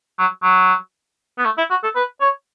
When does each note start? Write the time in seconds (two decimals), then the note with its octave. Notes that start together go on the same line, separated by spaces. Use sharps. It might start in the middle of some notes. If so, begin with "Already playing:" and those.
0.19 F#3
0.43 F#3
1.38 B3
1.45 A3
1.58 E4
1.70 F#4
1.83 A4
1.95 B4
2.21 C#5